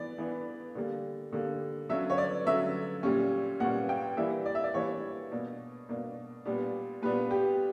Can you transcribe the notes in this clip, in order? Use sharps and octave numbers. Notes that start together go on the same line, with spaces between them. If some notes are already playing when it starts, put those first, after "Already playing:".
Already playing: E3 B3 D5
E3 B3 D4
D3 G3 A#3
D3 G3 A#3
D3 F#3 C#4 E5
C#5
D5
D3 F#3 C#4 E5
A#2 G3 C#4
A#2 G3 C#4 F#5
G5
E3 G3 A#3 D4 E5
D5
E5
D5
E3 G3 A#3 D4 C#5
B2 A#3 D4
B2 A#3 D4
A#2 G3 B3 D4
A#2 G3 B3 D4 B4
G4